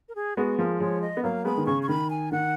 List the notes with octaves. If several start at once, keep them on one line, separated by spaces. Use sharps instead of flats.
A#4
G#4
G#3 B3 F#4
F3 G#3 A#4
F3 G#3 C#5
D#5
B3
F#3 A#3 F5
G#3 B3 B5
D#3
C#3 C#6
C#6
D#3 B5
G#5
D#3 F#5